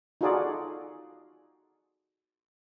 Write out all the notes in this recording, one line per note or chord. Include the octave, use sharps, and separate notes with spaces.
D#4 F4 F#4 G#4 A4 D5